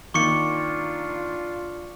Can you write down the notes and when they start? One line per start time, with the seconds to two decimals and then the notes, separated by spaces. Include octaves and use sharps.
0.14 D#3 A#3 D4 F4 C#6 D6 C#7